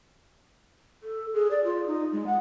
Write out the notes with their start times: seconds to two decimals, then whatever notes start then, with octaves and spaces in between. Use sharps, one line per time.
1.03 A4
1.33 G#4
1.51 D5
1.64 F4
1.87 D#4
2.12 G#3
2.26 F#5